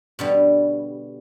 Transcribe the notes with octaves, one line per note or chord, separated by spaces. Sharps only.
B2 D3 G3